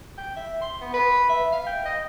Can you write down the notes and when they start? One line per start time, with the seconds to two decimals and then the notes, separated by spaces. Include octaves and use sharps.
0.18 G5
0.37 E5
0.62 C6
0.81 B3
0.94 B4
1.30 E5
1.52 F5
1.67 G5
1.85 D#5